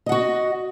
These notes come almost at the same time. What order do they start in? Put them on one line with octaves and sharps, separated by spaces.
D#5 F#5 F#4